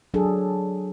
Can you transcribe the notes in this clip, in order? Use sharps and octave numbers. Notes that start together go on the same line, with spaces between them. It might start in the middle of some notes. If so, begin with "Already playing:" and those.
F#3 D4 G#4 A4